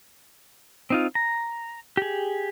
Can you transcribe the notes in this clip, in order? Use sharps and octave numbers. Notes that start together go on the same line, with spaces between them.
C4 D#4 F4
A#5
G4 G#4